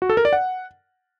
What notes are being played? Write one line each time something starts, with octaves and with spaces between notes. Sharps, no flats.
F#4
A4
A#4
D5
F#5